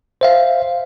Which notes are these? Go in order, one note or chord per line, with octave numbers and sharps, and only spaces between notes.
C5 E5 F5